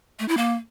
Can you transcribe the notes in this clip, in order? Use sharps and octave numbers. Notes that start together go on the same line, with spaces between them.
A3
E4
A#3